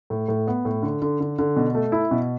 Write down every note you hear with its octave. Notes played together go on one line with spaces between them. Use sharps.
A2
A2
B3
A2
D3
D3
D3
D3
B2
A3
E4
B2